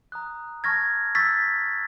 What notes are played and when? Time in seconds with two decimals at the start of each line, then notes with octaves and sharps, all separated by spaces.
0.12 A#5 D#6 F#6
0.64 A5 C#6 F6 G#6 A#6
1.15 C#6 E6 G6 A6 B6